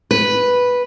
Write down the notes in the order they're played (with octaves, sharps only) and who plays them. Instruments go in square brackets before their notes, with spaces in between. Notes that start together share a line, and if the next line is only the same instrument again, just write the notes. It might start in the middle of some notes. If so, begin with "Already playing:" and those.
[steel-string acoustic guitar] B4